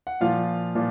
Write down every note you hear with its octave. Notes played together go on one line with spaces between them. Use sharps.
F#5
A#2 F3 F4 F5
A#2 F3